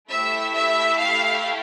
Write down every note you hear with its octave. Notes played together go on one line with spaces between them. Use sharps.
A3 E4 G4 E5
E5
F5